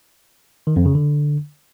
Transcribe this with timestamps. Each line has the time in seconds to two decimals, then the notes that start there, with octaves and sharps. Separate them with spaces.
0.67 D#3
0.76 F2
0.86 C#3
0.95 D3